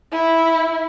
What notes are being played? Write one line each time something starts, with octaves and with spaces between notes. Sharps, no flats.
E4